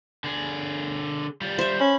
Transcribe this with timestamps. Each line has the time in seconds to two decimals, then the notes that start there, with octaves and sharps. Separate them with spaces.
0.24 D3 G#4
1.41 G3 F4
1.59 C5 E5
1.80 C#4 B5